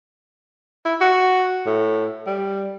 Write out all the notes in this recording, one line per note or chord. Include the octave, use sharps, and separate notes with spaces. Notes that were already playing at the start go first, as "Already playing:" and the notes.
E4
F#4
A2
G3